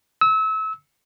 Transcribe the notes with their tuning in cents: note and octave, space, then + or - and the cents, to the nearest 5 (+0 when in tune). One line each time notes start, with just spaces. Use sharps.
E6 -30